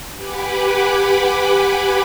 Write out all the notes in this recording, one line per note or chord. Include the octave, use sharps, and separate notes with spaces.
G4 B4 F#5 G#5 B5 D6